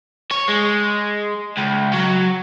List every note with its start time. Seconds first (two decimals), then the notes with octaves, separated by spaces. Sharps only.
0.31 C#5
0.48 G#3
1.58 C#2
1.94 F#3